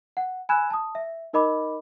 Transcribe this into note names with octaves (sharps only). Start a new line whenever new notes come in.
F#5
G#5 B5 E6 F#6 G#6 E7
A5 D#6
E5
D#4 A#4 D#5 B5 D6